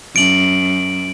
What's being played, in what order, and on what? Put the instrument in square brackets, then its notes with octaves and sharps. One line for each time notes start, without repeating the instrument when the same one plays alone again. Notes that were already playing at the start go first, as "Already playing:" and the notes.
[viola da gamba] F#2 [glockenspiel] D7 F#7